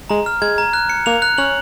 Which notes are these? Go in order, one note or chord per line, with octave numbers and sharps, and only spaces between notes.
G#3 A#5
F6
G#3 G#6
A#5
F#6
C#7
A#3 F7
F#6
C#4 F#7